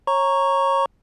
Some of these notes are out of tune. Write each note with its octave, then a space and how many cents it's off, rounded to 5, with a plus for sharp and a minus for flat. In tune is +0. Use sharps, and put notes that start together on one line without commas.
C#5 -25 A#5 +0 C#6 +0